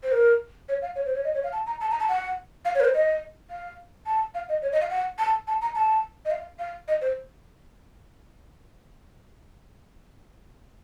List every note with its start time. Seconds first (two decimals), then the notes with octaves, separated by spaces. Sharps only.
0.03 C5
0.12 A#4
0.69 C#5
0.82 F5
0.96 C#5
1.06 C5
1.15 C#5
1.24 D#5
1.34 C#5
1.44 F5
1.53 A5
1.66 A#5
1.81 A5
1.91 A#5
2.00 A5
2.09 F#5
2.65 F5
2.75 C#5
2.80 A#4
2.84 C5
2.94 D#5
3.50 F5
4.06 A5
4.35 F5
4.49 D#5
4.62 C#5
4.72 D#5
4.81 F5
4.90 F#5
5.19 A5
5.47 A5
5.62 A#5
5.75 A5
6.25 D#5
6.31 F5
6.59 F5
6.88 D#5
7.01 C5